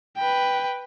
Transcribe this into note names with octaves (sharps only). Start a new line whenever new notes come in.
B4 G5